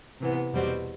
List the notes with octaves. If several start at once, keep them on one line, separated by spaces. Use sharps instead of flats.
C3 E3 B3
E2 B2 G3 C4 F#4